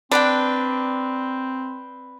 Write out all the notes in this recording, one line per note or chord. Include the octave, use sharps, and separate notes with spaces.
C4 D4 B4 D5 G5